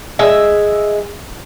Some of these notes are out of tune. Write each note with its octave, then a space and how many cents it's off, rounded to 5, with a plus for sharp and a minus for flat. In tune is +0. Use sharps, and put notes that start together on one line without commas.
G#3 +0 E5 +0